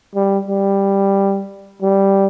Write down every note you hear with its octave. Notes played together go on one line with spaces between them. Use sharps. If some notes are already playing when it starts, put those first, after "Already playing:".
G3
G3
G3